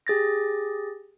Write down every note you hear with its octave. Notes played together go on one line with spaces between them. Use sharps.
G4 G#4 A6 A#6